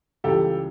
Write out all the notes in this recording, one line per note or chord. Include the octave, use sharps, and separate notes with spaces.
C#2 C#3 E3 G3 G4 A4